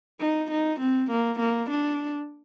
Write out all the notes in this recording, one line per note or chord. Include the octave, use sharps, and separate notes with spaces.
D#4
D#4
C4
A#3
A#3
D4